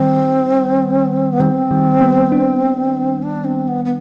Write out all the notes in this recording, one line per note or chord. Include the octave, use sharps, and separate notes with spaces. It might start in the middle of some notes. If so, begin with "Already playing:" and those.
Already playing: D#3 G3 C4
B3
D#3 G3 C4
D#3 G3
G3 B3
B3 D4
D4
C4
B3
B3